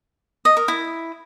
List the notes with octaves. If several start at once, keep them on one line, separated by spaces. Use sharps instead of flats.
D#5
A#4
E4